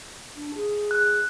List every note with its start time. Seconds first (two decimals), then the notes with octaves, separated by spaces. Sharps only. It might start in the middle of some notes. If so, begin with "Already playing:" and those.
0.36 D4
0.55 G#4
0.91 F#6